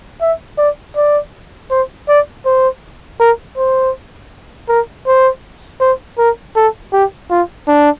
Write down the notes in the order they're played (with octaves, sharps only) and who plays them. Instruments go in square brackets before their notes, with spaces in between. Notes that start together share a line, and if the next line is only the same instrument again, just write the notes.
[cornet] E5
D5
D5
C5
D5
C5
A#4
C5
A#4
C5
C5
A#4
A4
G4
F4
D4